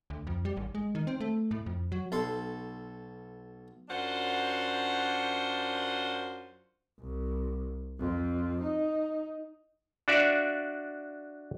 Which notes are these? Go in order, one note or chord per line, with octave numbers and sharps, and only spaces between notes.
D2
F2
G3
G#1
G#3
D#3
C4
A3
A2
F2
F#3
B1 A4 C6
F#2 D4 F4 C5 F#5
C2
F2
D#4
D4 F#4 D5 E5 F5